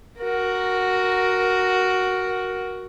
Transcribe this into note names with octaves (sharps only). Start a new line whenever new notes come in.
F#4 A#4